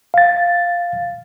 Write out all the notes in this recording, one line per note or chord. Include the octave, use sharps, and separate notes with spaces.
F5 A6